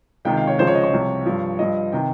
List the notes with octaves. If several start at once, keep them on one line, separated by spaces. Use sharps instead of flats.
C#2 C3 D#3 G5
F5
C#5
C#2 C#3 F3 C5
C#5
D#5
C#5
C2 C3 F3
G2 F3
G2 F3 D#5
C3 D#3 G5